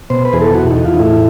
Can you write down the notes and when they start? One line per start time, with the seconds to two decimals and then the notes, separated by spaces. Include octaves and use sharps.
0.10 B2 C5
0.25 B4
0.33 E2 G#4
0.41 A4
0.55 E2 F#4
0.71 D#4
0.77 E2
0.85 F4
0.94 D#4
0.99 A2 E4